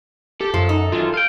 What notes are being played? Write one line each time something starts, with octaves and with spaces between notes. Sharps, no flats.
G4 A4
F#2 F3
D#4
F#2 D#3 E3 F4
F5 G5